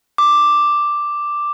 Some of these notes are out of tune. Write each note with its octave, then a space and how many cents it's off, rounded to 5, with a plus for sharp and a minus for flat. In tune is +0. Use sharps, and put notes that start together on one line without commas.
D6 +5